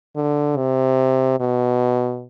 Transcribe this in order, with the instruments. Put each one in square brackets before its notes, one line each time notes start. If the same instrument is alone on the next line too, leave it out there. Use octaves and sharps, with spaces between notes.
[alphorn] D3
C3
B2